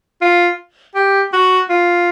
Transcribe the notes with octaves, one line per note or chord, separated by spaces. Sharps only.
F4
G4
F#4
F4